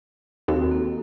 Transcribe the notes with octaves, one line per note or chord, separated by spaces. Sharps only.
D#2 C4 F#4 A4
A#3